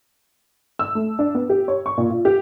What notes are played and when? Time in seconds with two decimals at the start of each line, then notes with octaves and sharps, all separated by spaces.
0.79 E6
0.95 A3
1.19 D4
1.35 B3
1.50 G4
1.68 C#5
1.86 C#6
1.98 A#2
2.10 F4
2.25 G4